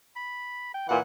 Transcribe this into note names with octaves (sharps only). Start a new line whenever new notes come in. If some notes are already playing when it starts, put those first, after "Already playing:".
B5
G5
A#2 E3 F#5